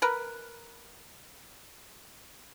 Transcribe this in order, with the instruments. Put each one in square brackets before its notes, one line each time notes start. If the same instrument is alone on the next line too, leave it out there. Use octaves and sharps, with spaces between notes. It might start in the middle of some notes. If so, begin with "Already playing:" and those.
[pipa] A#4 B4